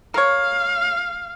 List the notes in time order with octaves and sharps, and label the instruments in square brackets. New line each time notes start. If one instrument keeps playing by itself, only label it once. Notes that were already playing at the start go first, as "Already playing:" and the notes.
[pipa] A#4 C#5 [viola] F5